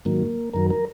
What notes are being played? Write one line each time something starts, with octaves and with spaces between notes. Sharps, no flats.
G#2 D#3 F#3 A#3
F#2 D#3 F#3 A#4
A#4